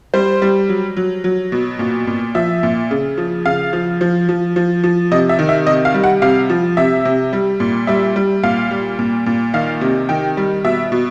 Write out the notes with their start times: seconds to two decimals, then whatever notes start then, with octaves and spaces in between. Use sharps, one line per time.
0.14 G3 C5
0.42 G3
0.69 F#3
0.97 F#3
1.24 F#3
1.52 B2
1.79 A#2
2.07 A#2
2.35 F3 E5
2.63 A#2
2.91 C#3
3.17 F3
3.45 C#3 F5
3.73 F3
4.01 F3
4.29 F3
4.56 F3
4.84 F3
5.11 C3 D#5
5.29 E5
5.39 D#3
5.49 E5
5.67 C3 D#5
5.85 F5
5.94 G3
6.04 F#5
6.22 C3 F5
6.50 F3
6.77 C3 E5
7.05 C3
7.33 G3
7.60 A#2
7.87 G3 E5
8.16 G3
8.43 A#2 F5
8.71 G3
8.99 A#2
9.26 A#2
9.54 D#3 F5
9.81 C3
10.09 D#3 G5
10.37 G3
10.64 B2 E5
10.92 B2